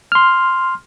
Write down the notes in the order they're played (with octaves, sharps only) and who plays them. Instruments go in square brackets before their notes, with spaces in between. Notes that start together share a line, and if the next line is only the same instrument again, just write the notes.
[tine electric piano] C6 F6